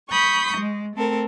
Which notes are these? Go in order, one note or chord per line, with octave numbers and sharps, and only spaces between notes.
B5 C#6 D#6 G6
G#3
A3 C4 A4 A#4